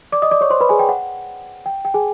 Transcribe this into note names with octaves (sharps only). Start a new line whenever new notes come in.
D5 D6
D#5 D#6
D5 D6
C#5 C#6
C5 C6
B4 B5
G#4 G#5
G5
F#5
G5
G5
G#4 G#5